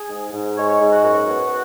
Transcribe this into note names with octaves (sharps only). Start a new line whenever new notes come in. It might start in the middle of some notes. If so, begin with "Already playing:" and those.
Already playing: G#4
G#2
G#2
G#3 C#5
C#5
G#2
F#4
F#2 F#4
B3